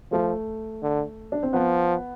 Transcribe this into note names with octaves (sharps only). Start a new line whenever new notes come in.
F3 A3
D3
D4
C4
F3 B3